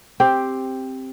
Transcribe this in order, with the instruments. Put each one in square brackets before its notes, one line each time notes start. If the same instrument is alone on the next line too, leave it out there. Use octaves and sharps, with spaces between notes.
[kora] C4 G4 C5